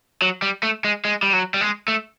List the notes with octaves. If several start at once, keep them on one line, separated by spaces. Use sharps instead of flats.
F#3
G3
A3
G#3
G#3
G3
F#3
G3
G#3
A3